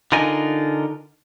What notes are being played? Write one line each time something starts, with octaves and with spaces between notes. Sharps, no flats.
D3 D#4 F4 A#4 D#5 G#5